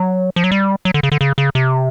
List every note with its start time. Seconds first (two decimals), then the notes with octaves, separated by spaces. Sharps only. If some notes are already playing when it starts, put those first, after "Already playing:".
Already playing: F#3
0.36 F3
0.44 F#3
0.52 G3
0.85 F#3
0.94 D3
1.03 C#3
1.12 D3
1.21 C#3
1.38 C#3
1.55 C3